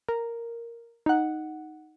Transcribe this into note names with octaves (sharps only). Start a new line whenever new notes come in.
A#4
D#4 F#5